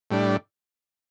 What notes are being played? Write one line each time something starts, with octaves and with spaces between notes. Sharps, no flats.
A2 G3 D4